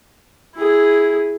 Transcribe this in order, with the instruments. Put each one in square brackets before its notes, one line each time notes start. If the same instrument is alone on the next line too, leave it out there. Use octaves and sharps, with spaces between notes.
[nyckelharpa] E4 G#4